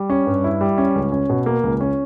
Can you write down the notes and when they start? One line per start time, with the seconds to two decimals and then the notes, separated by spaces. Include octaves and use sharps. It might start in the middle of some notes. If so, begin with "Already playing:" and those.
Already playing: G3
0.10 C#4
0.27 G2
0.44 E4
0.61 G3
0.78 C#4
0.95 C#2
1.12 C#4
1.30 B2
1.46 A#3
1.63 C#2
1.81 C#4